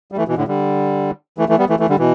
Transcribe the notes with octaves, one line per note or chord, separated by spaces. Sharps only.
G3
E3 A3
B2 E3
A2 D3
D3 G3
E3 A3
E3 A3
G3 B3
E3 A3
E3 A3
D3 G3
B2 E3